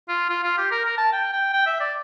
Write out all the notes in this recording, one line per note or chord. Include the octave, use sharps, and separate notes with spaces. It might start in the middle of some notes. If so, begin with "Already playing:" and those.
F4
F4
F4
G4
A#4
A#4
A5
G5
G5
G5
E5
D5